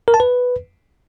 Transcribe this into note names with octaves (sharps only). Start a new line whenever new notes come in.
A#4
A5
B4